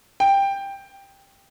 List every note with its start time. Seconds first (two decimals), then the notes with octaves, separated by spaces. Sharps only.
0.20 G5